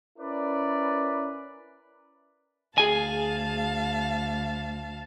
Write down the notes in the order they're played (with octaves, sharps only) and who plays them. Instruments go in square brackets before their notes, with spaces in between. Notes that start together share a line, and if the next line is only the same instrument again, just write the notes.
[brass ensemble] C#4 E4 A#4 B4 D5
[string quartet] D2 F5 A5 [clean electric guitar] G#4 G#5